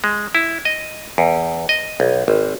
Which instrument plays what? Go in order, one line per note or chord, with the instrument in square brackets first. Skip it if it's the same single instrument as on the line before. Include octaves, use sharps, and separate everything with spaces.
[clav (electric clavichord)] G#3
E4
D#5
E2
D#5
B1
G#1